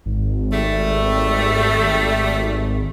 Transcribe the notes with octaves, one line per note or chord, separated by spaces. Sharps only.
G#1
G3 A3